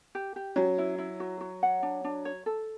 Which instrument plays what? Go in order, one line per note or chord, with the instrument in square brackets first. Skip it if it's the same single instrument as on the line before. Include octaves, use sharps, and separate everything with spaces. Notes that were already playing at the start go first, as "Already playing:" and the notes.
[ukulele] G4
G4
[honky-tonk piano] F#3 [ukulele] C#4
[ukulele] E4
E4
F#4
F#4
F#5
D4
D4
C#5
A4